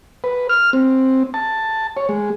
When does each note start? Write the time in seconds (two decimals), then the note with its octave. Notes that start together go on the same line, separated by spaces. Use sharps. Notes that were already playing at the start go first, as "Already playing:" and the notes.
0.24 B4
0.49 F6
0.73 C4
1.34 A5
1.97 C#5
2.09 G#3